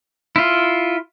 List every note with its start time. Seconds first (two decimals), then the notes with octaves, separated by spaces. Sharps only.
0.36 E4 F4